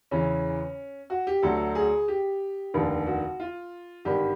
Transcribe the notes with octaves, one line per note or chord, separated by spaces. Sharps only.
E2 C#3 E3 C#4
F#4
G4
D2 D3 F#3 A4
G#4
G4
F1 D#2 D3
F#4
F4
G#1 G2 D3 G4